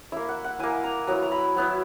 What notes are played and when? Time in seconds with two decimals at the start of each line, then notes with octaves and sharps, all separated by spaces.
0.12 A#3 E4 E5
0.29 F#5
0.44 F#5
0.59 A#3 E4 G#5
0.84 A#5
1.07 F#3 B3 E4 A#5
1.23 A#5
1.32 B5
1.56 F#3 B3 E4